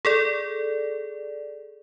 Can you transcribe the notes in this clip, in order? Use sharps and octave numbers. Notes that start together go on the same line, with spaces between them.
G#4 A4 D5